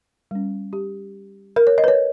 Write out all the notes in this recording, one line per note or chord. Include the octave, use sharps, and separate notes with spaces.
G3 C#4
G4
A#4
C#5
D#5
B4
C#5